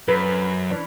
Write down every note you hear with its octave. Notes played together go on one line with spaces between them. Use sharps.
F#2 B4
E3 C#4 D4